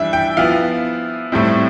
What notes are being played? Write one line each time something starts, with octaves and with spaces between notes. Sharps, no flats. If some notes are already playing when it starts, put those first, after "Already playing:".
Already playing: E3 G3 D4 E5
G5
F3 B3 E4 F5
A2 G3 C4 E4